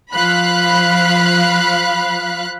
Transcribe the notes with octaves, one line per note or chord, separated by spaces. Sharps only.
F3 F5 B5 F#6